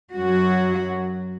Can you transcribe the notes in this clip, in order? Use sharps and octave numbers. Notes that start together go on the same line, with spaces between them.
F#2 F#3 F#4